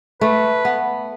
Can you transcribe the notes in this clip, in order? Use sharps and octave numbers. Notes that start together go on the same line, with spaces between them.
A3 B4
B3